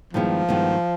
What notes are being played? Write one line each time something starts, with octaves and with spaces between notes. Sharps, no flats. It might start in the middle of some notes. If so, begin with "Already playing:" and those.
G2 D#3 F3 G#3 B3 E4
G2 D#3 G#3 B3 E4